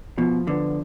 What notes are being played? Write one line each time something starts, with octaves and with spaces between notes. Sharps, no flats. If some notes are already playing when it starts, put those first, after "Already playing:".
B2 F3
D3 B3